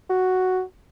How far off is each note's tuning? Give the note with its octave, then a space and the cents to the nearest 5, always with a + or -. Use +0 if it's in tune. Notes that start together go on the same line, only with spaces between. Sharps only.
F#4 +0